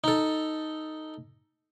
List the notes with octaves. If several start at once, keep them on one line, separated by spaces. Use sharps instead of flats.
D#4 A4